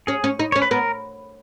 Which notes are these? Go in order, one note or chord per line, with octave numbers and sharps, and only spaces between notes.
C#4 G#4
C#4
D#4
C#4 C#5
B4
B3 A#4